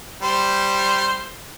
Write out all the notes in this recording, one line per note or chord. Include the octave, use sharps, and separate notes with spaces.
G3 C5